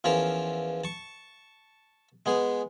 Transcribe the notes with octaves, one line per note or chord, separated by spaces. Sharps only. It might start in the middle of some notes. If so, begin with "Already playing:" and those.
E2 F3 C#4 A#4 A5 A#5
A5 C#6
G#3 B3 G#4